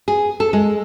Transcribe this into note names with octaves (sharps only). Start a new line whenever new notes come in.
G#4
A4
G#3